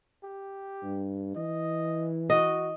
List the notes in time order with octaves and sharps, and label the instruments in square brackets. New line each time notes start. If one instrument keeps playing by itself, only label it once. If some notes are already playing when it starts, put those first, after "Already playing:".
[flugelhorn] G4
[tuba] G2
[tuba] E3 [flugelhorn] D#5
[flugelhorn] F#4 [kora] D#5